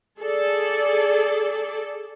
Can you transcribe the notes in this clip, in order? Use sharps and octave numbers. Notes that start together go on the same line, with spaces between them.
G#4 A4 D5